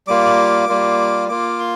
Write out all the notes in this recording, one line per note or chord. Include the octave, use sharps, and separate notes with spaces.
G3 A#3 F4 D6
G3 A#3 F4
A#3 F4 D6
C6